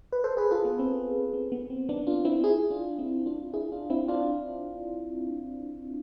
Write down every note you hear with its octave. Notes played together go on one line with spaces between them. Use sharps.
B4
A4 C5
G#4 B4
F4 A4
B3
C4
C4
B3
C4
B3 D4
D4 F4
C4 E4
E4 G#4
D4 F4
C4 E4
D4 F4
E4 G#4
D4 F4
C4 E4
D4 F4